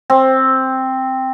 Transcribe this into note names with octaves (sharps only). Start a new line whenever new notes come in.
C4